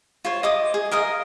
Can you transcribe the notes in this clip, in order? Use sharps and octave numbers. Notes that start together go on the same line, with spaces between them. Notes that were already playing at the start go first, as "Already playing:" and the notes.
F4 C5 C#5
D#5 D6 D#6
G#4
A#4 D#5 F5 D#6